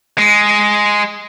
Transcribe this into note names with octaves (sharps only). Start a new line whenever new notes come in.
G#3